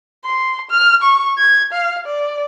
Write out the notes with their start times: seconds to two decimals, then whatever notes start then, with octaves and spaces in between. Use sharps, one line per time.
0.25 C6
0.70 F6
1.02 C#6
1.38 G#6
1.73 F5
2.06 D5